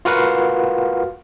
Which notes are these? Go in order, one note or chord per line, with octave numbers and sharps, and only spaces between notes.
F4 F#4 A#4 B4 F5 F#5